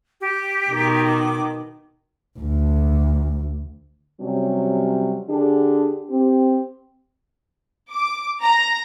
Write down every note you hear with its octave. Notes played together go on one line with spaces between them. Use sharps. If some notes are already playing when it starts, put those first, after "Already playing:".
G4
B2 D#3
D6
D2
C3 F#3 G3 C#4
D3 D4 G4 G#4
C4 G4
D6
A#5